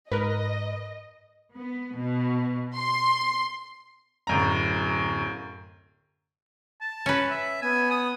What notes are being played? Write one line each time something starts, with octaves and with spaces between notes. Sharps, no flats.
G#2 A#4 B4 D#5
B3
B2
C6
D1 F#2 A#5
A5
C#4 B4
E5
B3 G#5
D#6